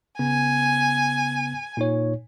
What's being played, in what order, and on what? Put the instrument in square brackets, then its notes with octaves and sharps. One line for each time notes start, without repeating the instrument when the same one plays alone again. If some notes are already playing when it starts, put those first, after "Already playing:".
[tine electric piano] C#3 B3 [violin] G#5
[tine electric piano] A#2 D#4 C#5